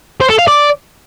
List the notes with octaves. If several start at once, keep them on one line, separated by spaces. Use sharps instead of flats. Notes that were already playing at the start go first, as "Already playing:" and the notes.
C5
A4
F5
D5